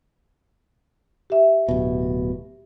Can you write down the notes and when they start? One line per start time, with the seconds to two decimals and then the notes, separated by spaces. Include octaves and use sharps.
1.30 G4 E5
1.68 D1 B2